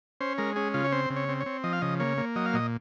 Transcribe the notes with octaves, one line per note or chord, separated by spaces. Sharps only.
C#4 C5
G#3 A#4
C#4 G#4
C#3 F4
C#5
C4 C5
C#3
C#5
C4
C#5
C4
F3 D#5
F5
C#3 D#5
A#3 C#5
A#3
F#3 D#5
F5
A#2 D#5